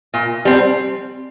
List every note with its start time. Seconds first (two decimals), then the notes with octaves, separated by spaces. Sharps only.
0.14 A#2
0.45 G3 C4